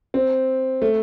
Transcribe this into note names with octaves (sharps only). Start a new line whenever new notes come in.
C4
A3